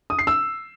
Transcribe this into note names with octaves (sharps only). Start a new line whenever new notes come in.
D#6
C7
E6